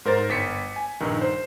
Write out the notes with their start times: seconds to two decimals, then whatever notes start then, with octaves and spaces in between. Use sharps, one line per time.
0.05 G#2 A#4 C5 A6
0.29 G1 B6 C#7
0.76 G#5
1.00 A#1 G2 D#3
1.21 C5